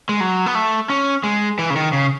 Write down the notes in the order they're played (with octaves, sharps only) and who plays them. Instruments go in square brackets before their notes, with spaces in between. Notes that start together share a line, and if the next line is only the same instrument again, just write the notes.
[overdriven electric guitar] G#3
F#3
B3
A3
C#4
G#3
E3
C#3
D#3
C#3